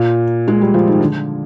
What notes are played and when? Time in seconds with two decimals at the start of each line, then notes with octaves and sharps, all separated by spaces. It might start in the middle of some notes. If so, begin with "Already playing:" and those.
Already playing: A#2
0.48 G#3
0.61 G3
0.74 F3
0.87 D#3
1.01 D3